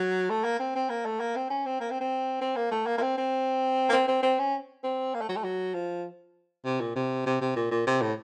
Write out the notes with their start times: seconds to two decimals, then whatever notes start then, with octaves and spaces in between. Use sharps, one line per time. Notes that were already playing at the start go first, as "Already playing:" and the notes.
Already playing: F#3
0.30 A3
0.44 A#3
0.59 C4
0.75 C4
0.90 A#3
1.06 A3
1.20 A#3
1.35 C4
1.50 C#4
1.66 C4
1.80 A#3
1.90 C4
2.01 C4
2.41 C4
2.56 A#3
2.71 A3
2.86 A#3
2.97 A#3
3.02 C4
3.18 C4
3.89 A#3
3.92 C4
4.08 C4
4.22 C4
4.39 C#4
4.83 C4
5.14 A#3
5.21 A3
5.29 F#3
5.36 A3
5.44 F#3
5.74 F3
6.65 C3
6.80 A#2
6.96 C3
7.26 C3
7.41 C3
7.56 A#2
7.71 A#2
7.87 C3
8.01 A2